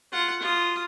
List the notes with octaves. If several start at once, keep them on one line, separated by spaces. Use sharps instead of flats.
F4 F#5
F4 D#6